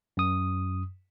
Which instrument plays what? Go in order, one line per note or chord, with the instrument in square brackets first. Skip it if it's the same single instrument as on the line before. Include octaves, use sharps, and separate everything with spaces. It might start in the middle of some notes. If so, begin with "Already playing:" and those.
[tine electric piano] F#2 D#6